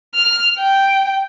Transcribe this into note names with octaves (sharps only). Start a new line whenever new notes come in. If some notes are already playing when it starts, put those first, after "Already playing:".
F6
G5